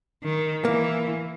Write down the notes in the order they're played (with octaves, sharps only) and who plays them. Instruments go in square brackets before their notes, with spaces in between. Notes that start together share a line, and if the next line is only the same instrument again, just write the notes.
[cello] D#3
[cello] E3 [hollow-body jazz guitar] A#3